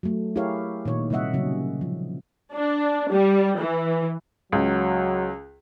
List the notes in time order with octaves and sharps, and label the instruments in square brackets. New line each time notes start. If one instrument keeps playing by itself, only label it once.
[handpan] F#3 A3
E4 G4 G#4 A#4 C#5 F5
A#2 D#3 D#4 C#5
C3 G3 A#3 D#5 E5 F#5
C#3 F#3 C#4
F3
[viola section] D4
G3
E3
[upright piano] C#2 [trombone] F#3